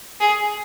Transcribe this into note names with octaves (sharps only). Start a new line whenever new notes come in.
G#4